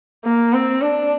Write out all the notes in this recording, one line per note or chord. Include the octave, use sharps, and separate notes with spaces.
A#3
C4
D4